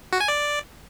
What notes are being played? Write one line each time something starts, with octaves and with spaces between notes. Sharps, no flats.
F#4
G#5
D5